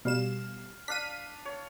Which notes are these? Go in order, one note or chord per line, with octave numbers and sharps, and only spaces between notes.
B2 G3 F5 E7
D4 F5 B6 D#7
C#5